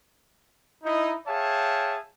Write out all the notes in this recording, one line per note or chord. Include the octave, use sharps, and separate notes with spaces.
D#4 E4
G#4 C#5 E5 F5 G5 A5